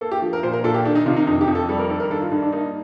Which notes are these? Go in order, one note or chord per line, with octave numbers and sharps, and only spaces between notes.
A#3 A4
G4
F3
A#4
A#2 C5
A#4
A#2 A4
G4
D#3 D4
D#4
C3 F4
D#4
F2 D#4
G4
F2
A4
G3 A4
A#4
D#3 A4
A#4
G2 A4
F4
G2 D#4
D4
A#3 D#4